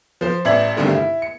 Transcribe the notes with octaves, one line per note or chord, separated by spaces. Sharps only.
F3 C5
A1 D5 E5 G#6 F#7
C2 G2 D3 D#3 A3
E4
C#7